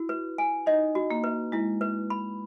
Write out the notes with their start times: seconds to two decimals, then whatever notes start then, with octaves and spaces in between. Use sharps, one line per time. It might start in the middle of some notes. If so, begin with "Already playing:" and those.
Already playing: E4 F#4
0.09 B4
0.38 G#5
0.66 D#4 D#5
0.95 F#4
1.10 A#3
1.24 B4
1.52 G#3 E4
1.81 B4
2.10 B5